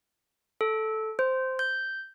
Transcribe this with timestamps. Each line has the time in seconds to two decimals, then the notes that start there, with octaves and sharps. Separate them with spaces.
0.61 A4
1.19 C5
1.59 G6